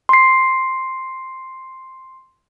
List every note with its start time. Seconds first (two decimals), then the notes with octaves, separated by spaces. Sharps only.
0.09 C6 C7